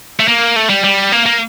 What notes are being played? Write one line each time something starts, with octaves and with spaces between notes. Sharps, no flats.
A3
A#3
A3
G3
G3
A#3
A#3